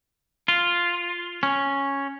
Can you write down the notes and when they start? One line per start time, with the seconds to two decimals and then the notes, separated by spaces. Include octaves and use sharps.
0.48 F4
1.43 C#4